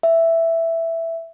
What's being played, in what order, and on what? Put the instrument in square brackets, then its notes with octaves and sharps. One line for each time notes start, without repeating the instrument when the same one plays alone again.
[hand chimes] E5